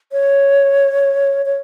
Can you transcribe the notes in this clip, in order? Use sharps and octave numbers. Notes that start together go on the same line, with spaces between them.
C#5
C#5